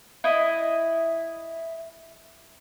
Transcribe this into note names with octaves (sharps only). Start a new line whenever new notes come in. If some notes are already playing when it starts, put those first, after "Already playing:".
E4 D#5